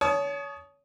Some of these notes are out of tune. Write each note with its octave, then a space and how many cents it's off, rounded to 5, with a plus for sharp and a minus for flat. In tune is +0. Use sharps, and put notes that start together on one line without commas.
C#5 +30 A5 -35 D#6 +0